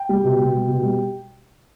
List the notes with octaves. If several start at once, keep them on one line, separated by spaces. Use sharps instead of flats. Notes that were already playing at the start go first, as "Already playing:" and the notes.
Already playing: G5
G3
B2
B2
G3
B2
G3